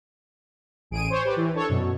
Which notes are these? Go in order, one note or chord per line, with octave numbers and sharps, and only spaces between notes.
A1 G#4 D7 D#7
C5 C#5
G4 B4 D5
E3
D4 A4 C#5
F#2 B2